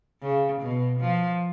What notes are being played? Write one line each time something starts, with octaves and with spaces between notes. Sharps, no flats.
C#3
B2
F3